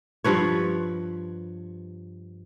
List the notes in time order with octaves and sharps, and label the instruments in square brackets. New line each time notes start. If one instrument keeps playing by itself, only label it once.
[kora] G2 F3 B4 C#5